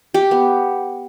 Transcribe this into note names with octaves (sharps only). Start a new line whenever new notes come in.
G4
B3